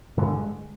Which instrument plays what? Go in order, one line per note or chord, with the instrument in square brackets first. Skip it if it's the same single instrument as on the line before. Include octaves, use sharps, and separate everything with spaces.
[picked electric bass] G2 D3 G#3